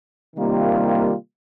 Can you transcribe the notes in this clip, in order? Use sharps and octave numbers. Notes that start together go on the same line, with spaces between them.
C3 D#3 G3 A#3 F4